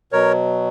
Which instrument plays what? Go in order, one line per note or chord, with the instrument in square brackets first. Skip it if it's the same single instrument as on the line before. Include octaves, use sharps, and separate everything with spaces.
[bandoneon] B2 F#3 A#4 C#5